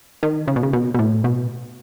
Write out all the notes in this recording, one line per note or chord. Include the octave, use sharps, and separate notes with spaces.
D#3
C#3
B2
C#3
B2
B2
A2
B2